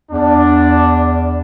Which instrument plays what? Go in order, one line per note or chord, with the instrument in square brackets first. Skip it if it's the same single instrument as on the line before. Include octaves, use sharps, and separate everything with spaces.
[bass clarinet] E2 [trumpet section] D4